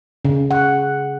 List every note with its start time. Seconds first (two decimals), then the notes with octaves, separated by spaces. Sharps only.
0.25 C#3
0.51 F#5